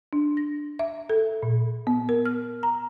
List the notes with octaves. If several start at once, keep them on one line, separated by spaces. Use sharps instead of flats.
D4
A#6
E5
A4
A#2
B3
A#4
F6
A#5